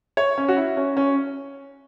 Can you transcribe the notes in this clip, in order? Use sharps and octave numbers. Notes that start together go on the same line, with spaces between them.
C#5
C#4
F#4
E4
C#4
C#4